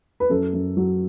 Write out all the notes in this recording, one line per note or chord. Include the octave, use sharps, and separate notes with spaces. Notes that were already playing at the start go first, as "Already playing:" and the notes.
B4
F#2 A4
F#2
F#3